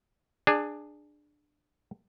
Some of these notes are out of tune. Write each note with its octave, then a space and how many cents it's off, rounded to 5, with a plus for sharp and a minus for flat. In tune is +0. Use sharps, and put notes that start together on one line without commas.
D4 +15 G#4 -5